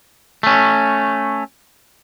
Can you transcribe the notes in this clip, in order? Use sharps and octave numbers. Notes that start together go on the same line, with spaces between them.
A3 C#4